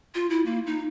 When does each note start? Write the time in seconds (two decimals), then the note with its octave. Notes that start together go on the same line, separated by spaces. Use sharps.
0.15 F4
0.30 E4
0.46 A#3
0.66 D#4